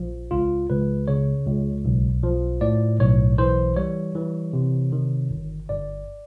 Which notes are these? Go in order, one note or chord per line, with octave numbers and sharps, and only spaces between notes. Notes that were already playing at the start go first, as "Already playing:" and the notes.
Already playing: A#1 F3
C#2 F4
C#2 B4
C#3 C#5
C#2
B1
F3
A2 D5
B1 C#5
E3 C5
G3 C#5
E3
C3
D#3
G1
G1 D5